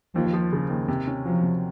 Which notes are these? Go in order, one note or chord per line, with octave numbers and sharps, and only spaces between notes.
D#2 F3
F3
C#3
D#2
C3
C#4
F3 F#3
C3